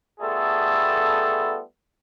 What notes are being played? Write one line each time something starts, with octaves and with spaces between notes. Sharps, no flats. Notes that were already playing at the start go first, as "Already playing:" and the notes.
G3 A3 B3 F4 G#4 A4